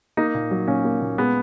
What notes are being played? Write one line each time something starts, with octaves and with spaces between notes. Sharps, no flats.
A#3 D#4
A#2
F#3
A#2 C#4
A#3
A#2
G#3 B3